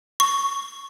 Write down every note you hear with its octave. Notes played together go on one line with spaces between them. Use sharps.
C#6